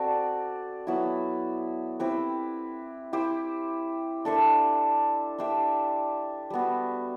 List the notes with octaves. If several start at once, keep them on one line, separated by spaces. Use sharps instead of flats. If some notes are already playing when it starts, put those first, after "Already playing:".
Already playing: C4 F#4 A4 D5
F#3 B3 E4
C4 E4 G4 B4
E4 G4 C5
D4 A4 C5 E5
D4 G4 C5 E5
G3 B3 F#4